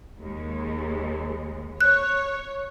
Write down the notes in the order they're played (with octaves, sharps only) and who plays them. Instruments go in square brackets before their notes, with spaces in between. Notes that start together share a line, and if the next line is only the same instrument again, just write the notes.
[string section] D#2 G#3
[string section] C#5 [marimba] F#6